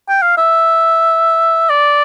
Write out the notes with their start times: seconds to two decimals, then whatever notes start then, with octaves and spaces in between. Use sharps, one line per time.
0.09 G5
0.22 F5
0.38 E5
1.70 D5